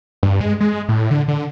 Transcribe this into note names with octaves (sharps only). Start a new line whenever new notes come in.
G2
G#3
G#3
A2
D3
D3